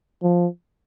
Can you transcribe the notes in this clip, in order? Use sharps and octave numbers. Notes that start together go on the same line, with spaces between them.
F3